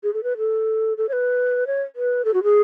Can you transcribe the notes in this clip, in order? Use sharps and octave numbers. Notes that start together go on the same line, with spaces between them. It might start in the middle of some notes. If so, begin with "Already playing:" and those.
G#4
A4
B4
A4
A4
C#5
B4
C#5
B4
A4
F#4
G#4